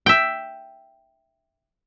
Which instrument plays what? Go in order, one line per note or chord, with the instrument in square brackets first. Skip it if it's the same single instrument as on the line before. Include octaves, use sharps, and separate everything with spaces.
[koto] E5 G5